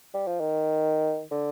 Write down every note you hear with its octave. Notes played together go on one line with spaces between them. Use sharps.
G3
F3
D#3
D3